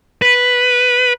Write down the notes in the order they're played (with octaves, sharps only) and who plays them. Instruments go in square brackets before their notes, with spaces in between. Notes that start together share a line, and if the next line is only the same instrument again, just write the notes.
[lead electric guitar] B4